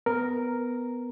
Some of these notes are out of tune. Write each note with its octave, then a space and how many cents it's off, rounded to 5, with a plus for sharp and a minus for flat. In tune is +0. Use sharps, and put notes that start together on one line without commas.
B3 +5 A#4 +0